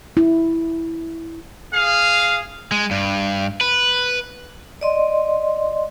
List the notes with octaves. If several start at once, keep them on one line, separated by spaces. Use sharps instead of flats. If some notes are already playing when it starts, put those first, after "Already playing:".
E4
G#4 F5
G#3
G2
B4
D5 D#5 C6